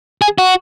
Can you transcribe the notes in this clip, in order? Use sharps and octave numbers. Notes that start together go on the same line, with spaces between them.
G#4
F#4